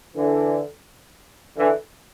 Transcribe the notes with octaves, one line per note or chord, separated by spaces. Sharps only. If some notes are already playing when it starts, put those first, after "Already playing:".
D3 E3
D3 E3